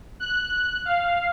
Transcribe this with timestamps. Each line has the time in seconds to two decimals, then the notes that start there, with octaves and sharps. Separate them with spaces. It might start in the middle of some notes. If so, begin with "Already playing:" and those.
0.20 F#6
0.85 F5